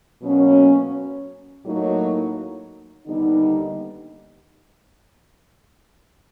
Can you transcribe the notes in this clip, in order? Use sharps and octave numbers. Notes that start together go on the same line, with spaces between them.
B2 F#3 A#3 C#4
A2 F#3 A#3 D#4
D#2 D3 G3 B3 D#4